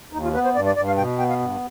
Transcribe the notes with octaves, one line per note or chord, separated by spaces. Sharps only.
D#2 D#4
F4
B3 B4
C5
G2 D5
D5
G2 D5
F5
B2 G5
B3 G5
F5
G2